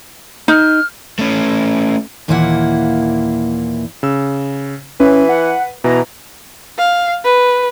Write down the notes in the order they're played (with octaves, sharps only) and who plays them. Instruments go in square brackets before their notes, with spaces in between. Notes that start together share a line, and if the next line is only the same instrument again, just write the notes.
[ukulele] D#4 [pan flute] F6
[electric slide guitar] A3 C#4
[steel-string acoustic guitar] D#2 A#2 E3 A#3 E4 F#5
[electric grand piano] C#3 E6
[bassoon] E3 [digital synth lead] C#4 [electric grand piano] B4
[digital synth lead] F#5
[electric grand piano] B2 [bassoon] E3 [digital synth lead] A#5
[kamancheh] F5
B4